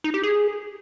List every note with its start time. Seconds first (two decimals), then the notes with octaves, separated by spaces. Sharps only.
0.04 D#4
0.14 G4
0.23 G#4